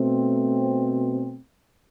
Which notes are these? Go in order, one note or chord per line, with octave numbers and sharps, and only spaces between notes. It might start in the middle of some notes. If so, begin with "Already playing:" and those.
Already playing: B2 A3 C4